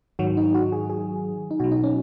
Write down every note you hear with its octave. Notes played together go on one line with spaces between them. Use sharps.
G#2 D#3 F#3 F#4
D#4
F#4
G#4
G#4
D#4
B2 F#3 F#4
D#4
C#4